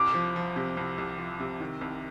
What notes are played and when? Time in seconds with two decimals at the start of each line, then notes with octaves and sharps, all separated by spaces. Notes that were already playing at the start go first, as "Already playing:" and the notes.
Already playing: C2 D6
0.14 F3
0.36 F3
0.56 C3
0.77 C2
0.98 C2
1.18 F3
1.40 C3
1.60 D#3
1.81 C2